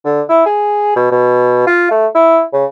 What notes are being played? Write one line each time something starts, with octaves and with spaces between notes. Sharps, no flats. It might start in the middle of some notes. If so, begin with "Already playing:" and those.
D3
E4
G#4
B2
B2
F4
A3
E4
C#3